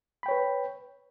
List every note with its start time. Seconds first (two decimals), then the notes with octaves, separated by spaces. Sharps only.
0.23 B5
0.26 G5
0.28 C#5
0.31 B4